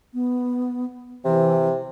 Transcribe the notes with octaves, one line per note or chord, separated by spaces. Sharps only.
B3
C3 E3